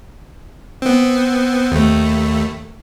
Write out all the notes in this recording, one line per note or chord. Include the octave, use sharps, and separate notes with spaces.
B3 C4
D#2 A3